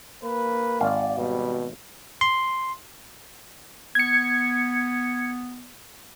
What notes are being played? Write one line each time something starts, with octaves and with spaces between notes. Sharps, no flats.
A#3 B4
G#1 D5 F5
B2 G3
C6
B3 G#6 C#7